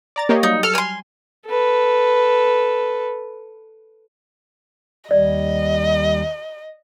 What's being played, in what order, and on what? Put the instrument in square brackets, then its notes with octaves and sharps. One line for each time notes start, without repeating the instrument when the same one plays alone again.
[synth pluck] D5 A#5 A6
[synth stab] A#3 [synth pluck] G4 C#5 D#5
[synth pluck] F#3 G3 [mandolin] D#4
[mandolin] A4 [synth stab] F6
[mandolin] G#5 C6
[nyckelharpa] A4 B4
[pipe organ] D#2 G3 [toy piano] D5 [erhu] D#5